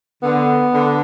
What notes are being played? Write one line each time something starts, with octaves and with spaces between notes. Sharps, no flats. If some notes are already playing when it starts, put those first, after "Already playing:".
D3 B3
D3